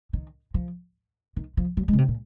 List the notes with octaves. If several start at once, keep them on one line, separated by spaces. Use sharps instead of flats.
D#3
F3
D#3
F3
F#3
G#3
C#3
C3
A#2